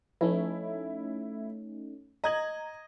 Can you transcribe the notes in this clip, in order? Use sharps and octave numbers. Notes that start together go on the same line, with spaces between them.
F3 A3 C#4 D#4 E4
D#5 A#5 G#6 F#7